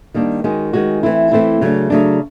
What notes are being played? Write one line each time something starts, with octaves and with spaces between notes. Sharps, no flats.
D#3 G3 A#3 D4
D#3 G#3 C#4 F#4
D#3 G#3 C#4 F#4
E3 A3 C4 E4
E3 A3 C4 E4
C#3 F#3 A3 D4
C#3 F#3 A3 D4